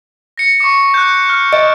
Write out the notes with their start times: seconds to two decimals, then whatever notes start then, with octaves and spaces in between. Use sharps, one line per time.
0.38 A#6 C#7
0.60 C#6 D6
0.94 F#6 G6
1.30 F6
1.53 D#5 D7 E7